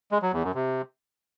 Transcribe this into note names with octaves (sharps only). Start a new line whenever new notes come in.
G#3
F#3
E2
F#2
C3